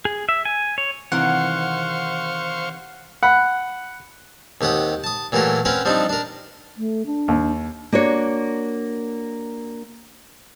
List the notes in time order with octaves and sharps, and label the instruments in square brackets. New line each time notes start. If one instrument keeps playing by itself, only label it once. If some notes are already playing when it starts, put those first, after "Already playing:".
[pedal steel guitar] G#4
E5
G#5
C#5
[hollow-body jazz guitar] C3 D#3 E3 [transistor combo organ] C5 F5 C#6 [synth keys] F#5
[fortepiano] F#5 B5
[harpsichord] D#2 C3 G4 F#5 D#6
A5 D#6
A#2 E3 F#3 A3 G4 A#4
C4 C#4 A#4 B4 F#5 G5
F3 G3 C4 D4 D#4
D4 A#4
[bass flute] A3
D4
[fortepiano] D#2
[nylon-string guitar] A#3 D4 F#4 C#5